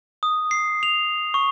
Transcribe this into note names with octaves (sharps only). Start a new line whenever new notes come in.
D#6
C7
F7
C#6